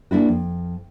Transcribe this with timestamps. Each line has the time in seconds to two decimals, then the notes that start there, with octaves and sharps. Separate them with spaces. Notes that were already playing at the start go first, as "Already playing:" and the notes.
0.11 A#3 D4 E4 F#4
0.29 F2